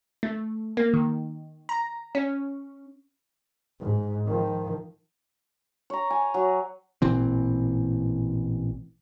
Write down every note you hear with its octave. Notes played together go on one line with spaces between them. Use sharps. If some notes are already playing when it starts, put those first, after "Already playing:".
A3
A#3
D#3
A#5
C#4
G#2
D#3 F3
C#5 A#5
G#5
F#3
A1 A#2 E3 C4